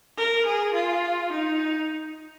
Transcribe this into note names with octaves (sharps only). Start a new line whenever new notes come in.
A#4
G#4
F4
D#4